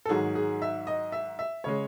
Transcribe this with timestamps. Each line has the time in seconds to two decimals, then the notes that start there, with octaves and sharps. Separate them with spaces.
0.05 A4
0.09 G#2 D#3 F#3 G#4
0.35 G#4
0.62 E5
0.87 D#5
1.12 E5
1.39 E5
1.64 C#3 G#3 C#5